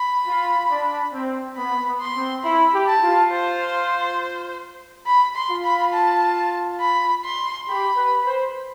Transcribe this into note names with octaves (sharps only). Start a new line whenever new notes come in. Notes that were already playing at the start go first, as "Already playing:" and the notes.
Already playing: B5
F4
D4
C4
B3 B5
B3
C6
C4
E4 B5
G4
A5
F4
C5
B5
C6
F4
B5
A5
B5
C6
G4 B5
B4
C5